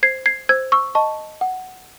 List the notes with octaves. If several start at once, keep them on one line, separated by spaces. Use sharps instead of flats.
C5 G#6 C7
G#6 C7
C5 E6 G#6
C#6 E6
D#5 A5 C#6
F#5